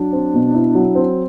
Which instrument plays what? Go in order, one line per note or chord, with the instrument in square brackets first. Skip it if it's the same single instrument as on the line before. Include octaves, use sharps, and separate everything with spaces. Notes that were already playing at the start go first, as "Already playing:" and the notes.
Already playing: [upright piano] F#3 [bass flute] D4
[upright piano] C4
B2
E4
F#3
C4